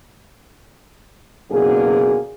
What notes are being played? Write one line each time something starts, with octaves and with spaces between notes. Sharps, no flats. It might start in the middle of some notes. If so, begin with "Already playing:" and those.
F#1 B2 D3 A#3 G#4